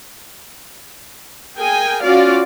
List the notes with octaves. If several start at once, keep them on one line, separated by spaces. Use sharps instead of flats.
G#4 A#4 G5 G#5
C#4 F4 F#4 D5 F5